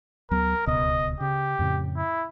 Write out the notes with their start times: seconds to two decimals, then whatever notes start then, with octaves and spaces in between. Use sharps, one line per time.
0.31 D2 F#3 B3 A#4
0.67 D1 C#2 B2 D#5
1.21 C#3 G4
1.59 F2 A2 C#3
1.97 E4